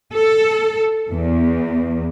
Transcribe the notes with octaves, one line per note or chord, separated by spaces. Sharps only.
A4
E2